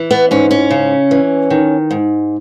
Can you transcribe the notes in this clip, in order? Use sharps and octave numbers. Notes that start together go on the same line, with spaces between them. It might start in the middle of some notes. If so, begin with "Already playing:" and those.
Already playing: E3
B3
G#2 C#4
C#4
C#3
E3
D#3
G#2